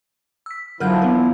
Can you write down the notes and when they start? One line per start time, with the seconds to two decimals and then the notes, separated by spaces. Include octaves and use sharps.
0.46 E6 B6
0.80 D3 F3 F#3 E4 F4 A#4 F6 G6
1.02 E2 B3 A#4